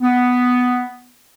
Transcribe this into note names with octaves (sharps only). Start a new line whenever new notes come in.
B3